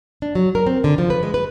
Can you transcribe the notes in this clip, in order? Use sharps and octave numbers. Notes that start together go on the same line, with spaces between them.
D4
F#3
A#4
C4
D3
F3
B4
G#3
B4